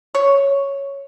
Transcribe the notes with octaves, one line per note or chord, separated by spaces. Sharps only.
C#5